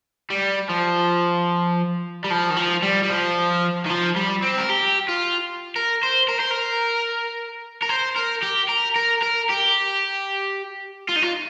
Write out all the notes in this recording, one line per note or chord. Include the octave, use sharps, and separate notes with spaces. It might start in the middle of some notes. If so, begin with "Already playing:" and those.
G3
F3
G3
F3
D#3
F3
G3
G3
F3
D#3
F3
G3
C4
A#4
G4
F4
A#4
C5
A#4
C5
A#4
A#4
C5
A#4
G4
A#4
A#4
A#4
G4
F4
D#4
F4